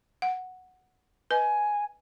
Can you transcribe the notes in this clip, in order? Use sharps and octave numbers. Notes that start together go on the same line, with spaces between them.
F#5
B4 D#5 G#5